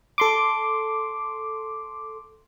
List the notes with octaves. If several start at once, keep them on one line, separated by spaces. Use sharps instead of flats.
A4 C6 D6